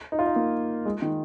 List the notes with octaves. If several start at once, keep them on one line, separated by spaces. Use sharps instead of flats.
D#4
F4
D#4
A#3
G#3
D#3